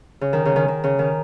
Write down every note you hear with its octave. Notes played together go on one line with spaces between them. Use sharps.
C#3
D#3
C#3
D#3
D#3
C#3
D#3